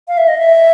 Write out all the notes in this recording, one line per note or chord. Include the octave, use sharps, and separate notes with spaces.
F5
E5
D#5
E5